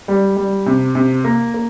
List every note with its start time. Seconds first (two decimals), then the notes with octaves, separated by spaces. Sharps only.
0.08 G3
0.36 G3
0.66 C3
0.95 C3
1.24 A#3
1.54 A#3